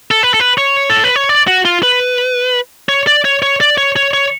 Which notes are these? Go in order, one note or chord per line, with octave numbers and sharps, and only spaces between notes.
A4
B4
A4
B4
C#5
A4
B4
C#5
D5
F#4
F4
B4
C#5
D5
C#5
C#5
D5
C#5
C#5
C#5